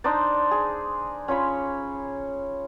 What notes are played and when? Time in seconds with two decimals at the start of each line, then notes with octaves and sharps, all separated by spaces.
0.04 D4 D#4 C5 D5
0.51 G#4
1.28 C#4 F4 C#5 B5